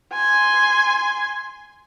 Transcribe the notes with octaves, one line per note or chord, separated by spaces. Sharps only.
G#5 C6